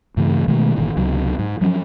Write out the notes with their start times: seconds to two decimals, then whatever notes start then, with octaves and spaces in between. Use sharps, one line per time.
0.17 G2 C#3 E3 A3
0.48 B2 D#3 G#3 A3
0.76 G1 A#2 D#3 E3
0.97 C#2 C3 F#3
1.39 G#2
1.61 F3 F#3 C#4